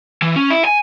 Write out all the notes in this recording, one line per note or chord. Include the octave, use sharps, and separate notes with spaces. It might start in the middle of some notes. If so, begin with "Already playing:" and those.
E3
C#4
E4
G#5